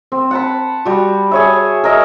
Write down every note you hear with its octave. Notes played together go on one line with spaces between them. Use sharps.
C4
F#5 A5 B5
G3 F#4
G#4 C#5 E5
A#4 D#5 E5